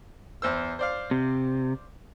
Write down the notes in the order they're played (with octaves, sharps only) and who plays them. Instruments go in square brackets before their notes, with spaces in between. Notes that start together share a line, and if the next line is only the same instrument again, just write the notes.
[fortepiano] E2 C5 E6
C5 D5 F5
[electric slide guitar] C3